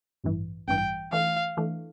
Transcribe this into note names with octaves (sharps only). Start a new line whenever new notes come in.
A1 G2 E3
A1 G2 E3 G5
E3 A3 D4 F5
E3 A3 D4